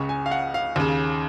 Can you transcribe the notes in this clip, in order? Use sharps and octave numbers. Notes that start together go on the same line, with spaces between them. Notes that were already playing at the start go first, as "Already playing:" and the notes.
Already playing: C#2 C#3 C#6
G#5
F5
F#5
F5
D#2 C#3